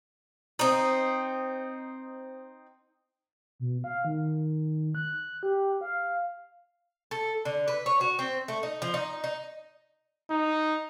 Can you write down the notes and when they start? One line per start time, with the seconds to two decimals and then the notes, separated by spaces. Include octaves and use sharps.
0.59 C4 D#4
3.60 B2
3.84 F5
4.05 D#3
4.95 F#6
5.43 G4
5.81 F5
7.11 A4
7.45 D3
7.68 B4
7.86 C#5
8.01 F#4
8.19 C4
8.48 A3
8.63 D#4
8.82 F3
8.94 D#4
9.24 D#4
10.31 D#4